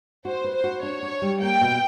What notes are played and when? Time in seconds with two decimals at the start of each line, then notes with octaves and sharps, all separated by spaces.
0.25 F#4 C5
0.44 B4
0.55 C5
0.64 F#4
0.83 D4 C#5
1.03 D4
1.22 G3
1.41 A#3 G5
1.61 B2